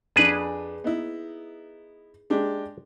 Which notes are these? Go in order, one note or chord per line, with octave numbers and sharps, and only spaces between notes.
F2 D4 G#4 B4
B3 D#4 E4
G#3 D4 G4